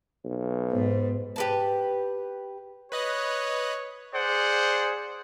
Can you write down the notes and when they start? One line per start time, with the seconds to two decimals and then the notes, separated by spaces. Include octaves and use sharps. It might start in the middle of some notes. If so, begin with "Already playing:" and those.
0.24 B1
0.72 G#2 B3 C5
1.36 G4 B4 A5
2.92 B4 C#5 D#5 F#6
4.14 G#4 C5 D5 F#5